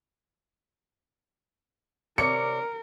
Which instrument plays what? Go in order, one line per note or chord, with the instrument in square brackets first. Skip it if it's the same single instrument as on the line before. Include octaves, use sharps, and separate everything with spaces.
[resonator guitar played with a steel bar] C3 C#5 D5 [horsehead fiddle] A#4 [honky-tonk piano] C#7